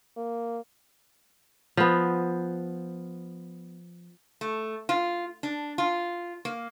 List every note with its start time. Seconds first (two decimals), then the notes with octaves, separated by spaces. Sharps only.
0.17 A#3
1.77 F3 B3
4.41 A3
4.89 F4
5.43 D4
5.78 F4
6.45 A#3